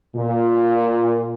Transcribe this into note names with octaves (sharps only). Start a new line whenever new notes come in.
A#2